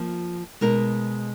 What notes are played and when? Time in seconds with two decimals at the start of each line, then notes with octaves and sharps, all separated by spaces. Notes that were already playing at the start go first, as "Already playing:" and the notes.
Already playing: F3 A#3 F4
0.61 B2 G#3 D#4 A#4